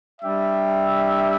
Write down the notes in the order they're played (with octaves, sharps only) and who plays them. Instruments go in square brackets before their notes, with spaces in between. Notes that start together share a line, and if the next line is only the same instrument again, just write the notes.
[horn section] G3 D4 G4 E5